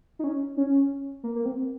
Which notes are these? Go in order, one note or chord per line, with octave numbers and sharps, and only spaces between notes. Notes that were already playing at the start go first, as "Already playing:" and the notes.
D#4
C#4
C#4
A#3
A#3
C4